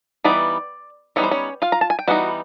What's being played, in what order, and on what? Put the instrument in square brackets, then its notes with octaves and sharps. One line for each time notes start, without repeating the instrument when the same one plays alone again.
[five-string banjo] E3 G3 B3 D#4 D5
E3 G3 B3 D#4 C#5
C5
C#4 C#5
F4 F5
A#5
A5
G#5
G5
E3 G3 B3 D#4 F#4 F#5